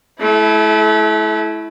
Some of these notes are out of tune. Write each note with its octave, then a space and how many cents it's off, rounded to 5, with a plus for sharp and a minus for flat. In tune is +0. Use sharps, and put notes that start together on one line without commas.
A3 -30 E4 +0